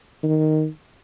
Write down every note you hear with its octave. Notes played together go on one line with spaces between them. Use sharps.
D#3